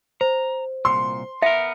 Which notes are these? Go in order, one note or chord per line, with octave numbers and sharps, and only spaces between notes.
C5 A#5
C2 A#2 C6
B3 A#4 E5